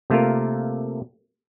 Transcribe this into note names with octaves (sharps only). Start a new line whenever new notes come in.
C3 A3 A#3 F4 A#4